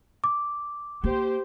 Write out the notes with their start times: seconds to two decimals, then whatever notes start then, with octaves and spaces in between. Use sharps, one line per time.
0.24 D6
1.04 A#3 G4 C5